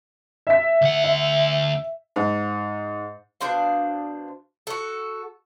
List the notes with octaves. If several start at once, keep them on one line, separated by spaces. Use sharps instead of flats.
E5 B6
D2 F#5
E5
G#2
B2 D4 C5 F5
F#4 A4